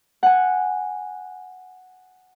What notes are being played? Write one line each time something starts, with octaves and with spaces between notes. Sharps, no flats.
F#5 G#5